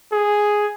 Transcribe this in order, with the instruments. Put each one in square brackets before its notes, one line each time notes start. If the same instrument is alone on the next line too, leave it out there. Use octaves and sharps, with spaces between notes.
[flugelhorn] G#4